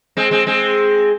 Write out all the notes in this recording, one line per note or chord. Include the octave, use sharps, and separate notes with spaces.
G#3 C4
G#3 C4
G#3 C4